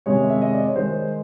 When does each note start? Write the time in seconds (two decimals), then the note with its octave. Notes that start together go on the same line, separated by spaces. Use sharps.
0.06 C3 D#3 G#3 C#5
0.30 E5
0.42 D#5
0.53 D5
0.64 C#5
0.76 D#3 G#3 C5